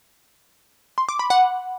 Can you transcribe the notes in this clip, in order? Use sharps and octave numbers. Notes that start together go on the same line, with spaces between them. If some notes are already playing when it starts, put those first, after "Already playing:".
C6
D6
B5
F#5